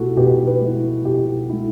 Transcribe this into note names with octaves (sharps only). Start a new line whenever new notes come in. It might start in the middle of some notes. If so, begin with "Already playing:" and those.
Already playing: B2 A3 E4 F#4 G4 A4
B2 G4 B4
G4 B4
A3 E4
B2 G4
A3 E4